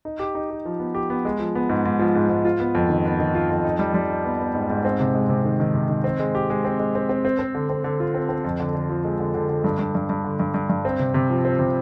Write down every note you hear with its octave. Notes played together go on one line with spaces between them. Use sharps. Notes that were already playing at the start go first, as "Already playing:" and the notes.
D#4
G4
D#4
G4
F3
B3
G4
B3
G#3
F3
B3
G#2
G#2
F3
G#2
G#2
F4
B3
F2
D#3
B3
D#3
F4
F2
D#4
G3
G3
D#4
B3
B3
G#2
G#2
C4
C3
G#3
C3
D#3
D#3
C3
D#3
C4
G#3
G4
G#3
C4
G#3
C4
C4
C4
C4
D3
C4
D3
F4
C4
C4
F2
D3
D3
F3
G#3
D3
D3
D3
G2
G2
G2
G2
D3
G2
G2
G2
C4
C3
C3
F3
C4
C3